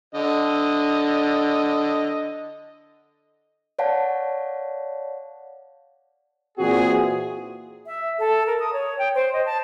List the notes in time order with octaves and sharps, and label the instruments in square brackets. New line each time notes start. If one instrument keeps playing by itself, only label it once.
[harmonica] D3 D#5
[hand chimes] C#5 D5 F5 F#5 A5
[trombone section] A#2 E3 F#4 [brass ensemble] C4 G#4
[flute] E5
A4
A#4
D#6
C#5
G5
C5
D#5
A5